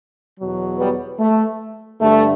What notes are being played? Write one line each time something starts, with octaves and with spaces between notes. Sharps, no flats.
E2 B2 F#3
G3 B3
A3
G2 D3 G3 A3